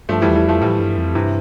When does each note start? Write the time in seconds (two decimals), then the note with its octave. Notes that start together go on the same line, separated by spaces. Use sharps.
0.09 G2 F3 A3
0.22 E3 G3
0.27 E2
0.35 E3 G3
0.45 F2 F3 A3
0.62 A2 E3 G3
0.79 G2
0.97 F2
1.15 G2 C3 E3